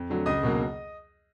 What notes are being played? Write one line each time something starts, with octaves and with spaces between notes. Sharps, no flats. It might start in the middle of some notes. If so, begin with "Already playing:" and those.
Already playing: F2
D3 F#3 A3
C#2 D#5 D#6
B2 F#3 A#3